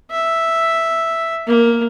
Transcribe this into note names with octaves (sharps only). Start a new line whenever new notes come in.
E5
A#3